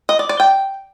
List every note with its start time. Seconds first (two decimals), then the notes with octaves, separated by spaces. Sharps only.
0.09 D#5
0.19 D5
0.29 D5
0.40 G5